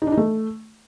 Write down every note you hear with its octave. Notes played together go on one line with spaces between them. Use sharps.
D#4
D4
D#4
A3